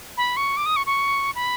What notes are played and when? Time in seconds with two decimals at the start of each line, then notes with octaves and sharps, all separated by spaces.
0.17 B5
0.37 C#6
0.57 D6
0.66 D#6
0.76 C#6
0.86 C#6
1.35 B5